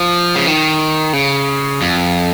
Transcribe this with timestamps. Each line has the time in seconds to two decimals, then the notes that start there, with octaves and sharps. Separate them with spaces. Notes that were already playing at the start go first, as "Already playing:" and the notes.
Already playing: F3
0.36 C#3
0.47 D#3
1.13 C#3
1.82 F2